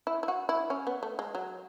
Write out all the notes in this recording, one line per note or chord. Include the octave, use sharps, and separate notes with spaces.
E4
E4
F#4
E4
C#4
B3
A3
G#3
F#3